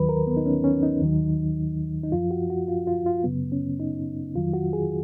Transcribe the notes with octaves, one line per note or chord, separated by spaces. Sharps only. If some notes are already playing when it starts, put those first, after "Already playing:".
Already playing: D#2 D#3 F#3 B4
A#4
B3
D#4
C#4
C#4
D#4
D#2 D#3 F#3
D#4
F#2 F3 F4
F#4
F#4
F4
F4
F4
F#2 C#3 F#3 B3
C#4
D#4
F2 D#3 F#3 F4
F#4
G#4